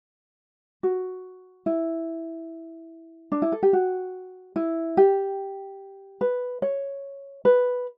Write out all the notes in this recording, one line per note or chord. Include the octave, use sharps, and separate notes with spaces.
F#4
E4
D4
E4
A4
G4
F#4
E4
G4
B4
C#5
B4